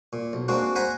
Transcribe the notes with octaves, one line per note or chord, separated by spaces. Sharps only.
A#2
B1
G#3 A#3 C4 D4 F#4
C5 F#5 G#5 A#5 B5